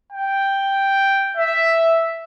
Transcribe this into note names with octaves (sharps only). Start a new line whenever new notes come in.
G5
E5